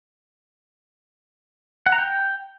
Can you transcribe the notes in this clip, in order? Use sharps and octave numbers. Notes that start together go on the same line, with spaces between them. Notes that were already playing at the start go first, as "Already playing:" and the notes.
F#5
A#5
G5